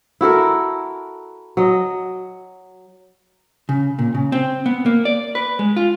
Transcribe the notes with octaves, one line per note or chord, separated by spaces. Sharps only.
E4 F#4 A4 A#4
F#3 D#5
C#3
A#2
C#3
C4
B3
A#3
D5
B4
G#3
F4